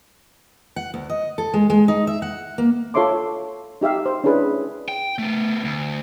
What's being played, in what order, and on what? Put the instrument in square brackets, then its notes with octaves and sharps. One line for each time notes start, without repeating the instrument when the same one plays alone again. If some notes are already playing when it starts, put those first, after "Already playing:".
[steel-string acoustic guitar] F#5
D2
D#5
A4
G#3
G#3
D#4
E5
F#5
A#3
[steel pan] F4 A4 C#5 E5 C6 D6
D#4 G4 E5 F5
C5
C#4 D4 E4 G#4 B4
[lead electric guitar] G5
A3 B3
D2